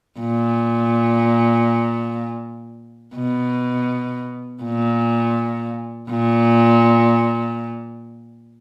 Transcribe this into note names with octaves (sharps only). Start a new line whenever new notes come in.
A#2
B2
A#2
A#2